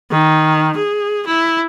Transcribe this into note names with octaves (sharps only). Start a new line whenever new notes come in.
D#3
G#4
E4